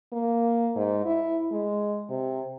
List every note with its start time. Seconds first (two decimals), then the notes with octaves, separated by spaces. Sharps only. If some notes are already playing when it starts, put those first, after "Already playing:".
0.12 A#3
0.76 G#2
1.05 E4
1.52 G#3
2.09 C3